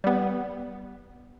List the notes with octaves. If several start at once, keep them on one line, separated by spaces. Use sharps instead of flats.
G3 B3